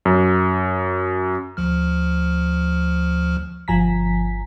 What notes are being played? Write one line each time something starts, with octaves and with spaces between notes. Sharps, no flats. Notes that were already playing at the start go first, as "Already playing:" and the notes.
F#2
D2 F3 F6
G1 F3 G#5 A#5 B6